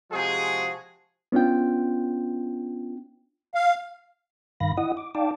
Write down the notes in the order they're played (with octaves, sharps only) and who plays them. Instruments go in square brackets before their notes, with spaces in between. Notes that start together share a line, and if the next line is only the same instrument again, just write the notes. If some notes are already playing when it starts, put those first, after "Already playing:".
[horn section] C3 F3 G#3 F#4 G#4
[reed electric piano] B3 C#4 D4 F4 G5
[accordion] F5
[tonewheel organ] G2 D#3 F5 B5 A#6
E4 D#5 F#5 D#6
D6
D#4 D5 F5 G5 A5 D6